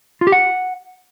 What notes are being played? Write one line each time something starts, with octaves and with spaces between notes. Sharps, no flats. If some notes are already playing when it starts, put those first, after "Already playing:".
F4
G4
F#5